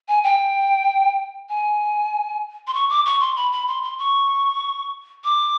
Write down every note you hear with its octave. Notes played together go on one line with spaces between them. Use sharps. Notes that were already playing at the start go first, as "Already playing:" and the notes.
G#5
G5
G#5
C6
C#6
D6
C#6
C6
B5
B5
C6
C6
C#6
D6